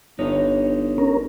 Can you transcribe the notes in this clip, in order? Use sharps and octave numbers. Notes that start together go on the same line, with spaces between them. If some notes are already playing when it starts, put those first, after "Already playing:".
G1 D#4 C#5
C#4 A#4